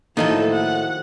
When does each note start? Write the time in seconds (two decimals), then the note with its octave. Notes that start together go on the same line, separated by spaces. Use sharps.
0.17 A2 D#3 F3 F#3 A#3 A4 D#5 A5
0.50 F#5